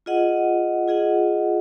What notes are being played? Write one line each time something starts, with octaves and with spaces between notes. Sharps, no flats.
F4 G#4 D#5 F#5
F4 G#4 D#5 F#5